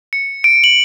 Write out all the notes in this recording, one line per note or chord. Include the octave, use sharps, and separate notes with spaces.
C#7
D7
F#7